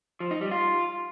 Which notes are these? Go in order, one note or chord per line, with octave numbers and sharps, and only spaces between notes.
F3
D#4
G3
F4